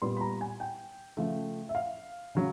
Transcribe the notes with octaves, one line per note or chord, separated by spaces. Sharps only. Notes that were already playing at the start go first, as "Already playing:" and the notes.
A#2 G3 B3 C6
B5
A#5
G#5
G5
C#3 F3 A3
E5
F5
C#3 F#3